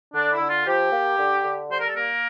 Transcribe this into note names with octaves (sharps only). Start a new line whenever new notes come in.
D3 D4
E4
D3
F4
F3 G4
A#3
D3
D3
G3 C5
A#4
A4
A#3 A#4